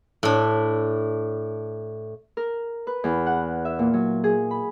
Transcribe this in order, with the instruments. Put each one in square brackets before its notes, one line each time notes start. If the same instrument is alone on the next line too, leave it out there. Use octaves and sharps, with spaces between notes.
[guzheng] A2 D4
[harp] A#4
B4
E2
F#5
E5
A#2
F#3
G#4
B5